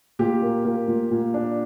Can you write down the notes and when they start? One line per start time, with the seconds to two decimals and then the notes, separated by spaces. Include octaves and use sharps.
0.19 A#2 G4
0.42 A#3
0.65 A#3
0.88 A#2
1.11 A#2
1.34 D4